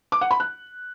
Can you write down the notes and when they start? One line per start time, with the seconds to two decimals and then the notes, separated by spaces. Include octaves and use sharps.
0.12 D6
0.21 F#5
0.31 B5
0.40 F#6